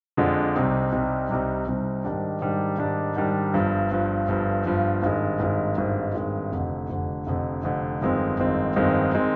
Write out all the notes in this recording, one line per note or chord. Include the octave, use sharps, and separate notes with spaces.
F2 D3 G#3 D4 F4
C2 C3 G3 C4 D#4
C2 C3 G3 C4 D#4
C2 C3 G3 C4 D#4
C2 C3 G3 C4 D#4
G#2 D#3 G3 D4
G#2 D#3 G3 D4
G#2 D#3 G3 D4
G#2 D#3 G3 D4
G1 G2 F3
G1 G2 F3
G1 G2 F3
G1 G2 F3
G#1 G2 D#3 G#3
G#1 G2 D#3 G#3
G#1 G2 D#3 G#3
G#1 G2 D#3 G#3
F1 F2 D3
F1 F2 D3
F1 F2 D3
F1 F2 D3
G1 F2 D#3 G#3 C4
G1 F2 D#3 G#3 C4
G1 F2 D#3 G#3 C4
D#3 G#3 C4